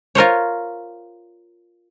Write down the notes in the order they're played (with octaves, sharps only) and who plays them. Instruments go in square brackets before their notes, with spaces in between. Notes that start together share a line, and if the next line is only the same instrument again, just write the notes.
[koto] F4 A#4 C5 C#5